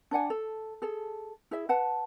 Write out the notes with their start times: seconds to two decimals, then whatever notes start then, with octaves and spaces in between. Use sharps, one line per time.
0.11 D4 D5 F#5 G#5
0.30 A4
0.82 G#4 A4
1.51 E4 G#4 E5
1.69 B4 F#5 A5